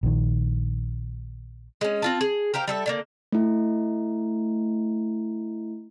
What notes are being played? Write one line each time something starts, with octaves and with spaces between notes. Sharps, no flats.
A#1 D#3
G#3 C#4
C4 F4 A5
G#4
G4 A#4 C5 F5
G3 A4 E5
D3 F#3 A#3
A3 E4